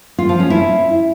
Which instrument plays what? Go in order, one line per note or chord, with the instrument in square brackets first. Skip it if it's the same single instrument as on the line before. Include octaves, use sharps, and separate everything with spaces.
[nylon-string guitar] F4
F3
C#4
E4